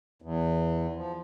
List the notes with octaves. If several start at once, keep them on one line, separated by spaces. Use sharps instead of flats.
E2
F3